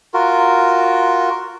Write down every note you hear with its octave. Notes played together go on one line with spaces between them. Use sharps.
F4 F#4 A#4